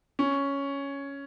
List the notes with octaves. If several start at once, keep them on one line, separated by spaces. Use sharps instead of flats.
C#4